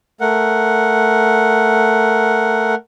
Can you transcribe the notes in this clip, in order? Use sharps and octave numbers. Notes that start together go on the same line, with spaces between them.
A3 A#4 F#5